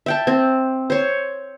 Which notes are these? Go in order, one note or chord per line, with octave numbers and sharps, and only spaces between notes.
E5 G5 A5
C4
C5 C#5